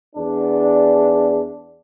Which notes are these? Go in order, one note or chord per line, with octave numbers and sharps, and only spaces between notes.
E2 D4